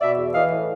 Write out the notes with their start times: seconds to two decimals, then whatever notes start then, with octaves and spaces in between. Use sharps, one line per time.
0.01 B2 D5 E5
0.18 E2
0.34 E3 D#5 F5
0.51 A2